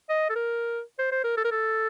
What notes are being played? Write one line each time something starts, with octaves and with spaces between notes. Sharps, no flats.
D#5
A4
A#4
C5
C5
A#4
A4
A#4
A4